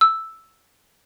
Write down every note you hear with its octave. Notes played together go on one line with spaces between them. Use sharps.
E6